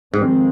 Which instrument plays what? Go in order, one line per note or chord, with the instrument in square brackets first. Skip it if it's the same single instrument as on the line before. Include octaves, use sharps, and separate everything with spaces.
[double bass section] F2 D#3 G#3 C4 [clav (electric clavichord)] G#2